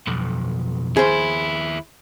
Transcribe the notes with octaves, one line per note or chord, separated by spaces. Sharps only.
B1 F2
D#2 E4 G#4 C5